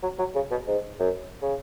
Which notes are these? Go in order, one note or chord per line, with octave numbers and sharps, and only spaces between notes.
F#3
F#3
C#3
B2
G#2
F#2
C#3